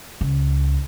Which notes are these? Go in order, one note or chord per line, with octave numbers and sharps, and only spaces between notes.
C#2